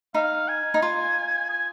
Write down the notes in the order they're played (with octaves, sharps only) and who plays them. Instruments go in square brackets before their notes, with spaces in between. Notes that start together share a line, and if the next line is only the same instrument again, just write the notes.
[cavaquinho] D#4 [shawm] F5
[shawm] G#5
[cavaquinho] D#4
F4
[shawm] G#5